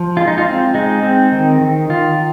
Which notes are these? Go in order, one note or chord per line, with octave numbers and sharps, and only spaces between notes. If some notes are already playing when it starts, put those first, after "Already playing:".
Already playing: F3
G#3 F4
D#4
F4
C4
G#3 D#4
C4
D#3
D#3
D#3 F4